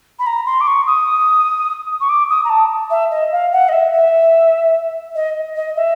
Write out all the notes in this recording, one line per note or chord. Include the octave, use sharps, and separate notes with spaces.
B5
A#5
C6
D6
C#6
D#6
C#6
D6
D#6
A#5
A5
E5
D#5
F5
F#5
D#5
E5
E5
D#5
D#5
E5